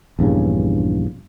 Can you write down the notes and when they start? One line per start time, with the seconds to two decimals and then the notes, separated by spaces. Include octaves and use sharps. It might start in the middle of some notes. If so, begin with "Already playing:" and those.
0.19 A#1 E2 G2 C#3